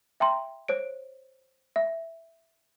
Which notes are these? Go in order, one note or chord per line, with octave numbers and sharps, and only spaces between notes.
E5 G5 A#5 C6
C5 C#5 D7
E5